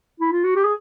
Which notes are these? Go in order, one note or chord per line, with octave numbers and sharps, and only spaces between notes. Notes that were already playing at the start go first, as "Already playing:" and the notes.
E4
F4
F#4
G4
G#4